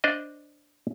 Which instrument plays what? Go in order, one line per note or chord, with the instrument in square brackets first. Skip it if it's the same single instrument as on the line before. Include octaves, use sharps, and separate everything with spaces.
[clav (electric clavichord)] D4 C5 D5 D#5